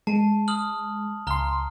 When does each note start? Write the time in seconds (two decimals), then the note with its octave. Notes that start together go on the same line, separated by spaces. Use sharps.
0.07 G#3 A5
0.48 D#6 F6 F#7
1.27 C#2 A#5 C6 F6 G7